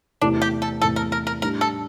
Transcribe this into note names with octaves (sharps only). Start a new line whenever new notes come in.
E2 C3 E3 A3 D4
G4
A4
E2 C3 E3 A3 A4
A#4
A#4
A#4
A2 G3 D4 A#4
A4